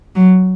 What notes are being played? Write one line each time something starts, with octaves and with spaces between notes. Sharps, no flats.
F#3